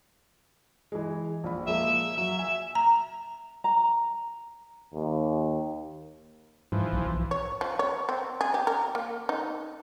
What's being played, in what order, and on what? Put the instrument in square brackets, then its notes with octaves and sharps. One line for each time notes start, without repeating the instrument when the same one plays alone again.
[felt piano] E3 G#3
A#1 B5
[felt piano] F3 G#3 A#3 [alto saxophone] E5
[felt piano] F#3 [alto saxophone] E5
[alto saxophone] E5 [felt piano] G#5
[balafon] A#5
[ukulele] A#5
[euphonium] D#2
[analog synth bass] G#2 [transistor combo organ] E3 F3
[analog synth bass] B1
[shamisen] C#5
F3
C#5
C4
G#4
G4
A#4
A#3
D#4